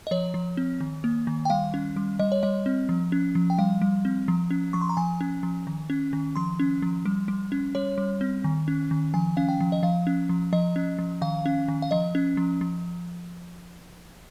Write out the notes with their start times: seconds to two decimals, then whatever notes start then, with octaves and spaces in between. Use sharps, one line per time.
0.07 D#5
0.11 F3 C#5
0.34 F3
0.57 C4
0.80 D#3
1.04 A#3
1.27 D#3
1.45 G5
1.50 G3 F5
1.74 C#4
1.96 G3
2.19 G3 D#5
2.32 C#5
2.43 G3 D#5
2.66 C4
2.89 F3
3.12 C#4
3.35 F3
3.50 G5
3.58 G3 F5
3.82 G3
4.05 C4
4.28 F3
4.51 C#4
4.73 F3 C#6
4.81 C6
4.89 A#5
4.97 F3 G#5
5.21 C#4
5.43 F3
5.67 D#3
5.90 C#4
6.13 D#3
6.36 F3 C6
6.60 C#4
6.82 F3
7.05 G3
7.28 G3
7.52 C#4
7.75 G3 C#5
7.98 G3
8.21 C4
8.44 D#3
8.68 C#4
8.91 D#3
9.14 F3 G#5
9.37 C#4 F5
9.49 G5
9.60 F3
9.72 D#5
9.83 F3 F5
10.07 C#4
10.29 F3
10.53 F3 D#5
10.76 C#4
10.98 F3
11.22 D#3 F5
11.46 C#4
11.68 D#3
11.82 F5
11.91 F3 D#5
12.15 C#4
12.37 F3
12.61 F3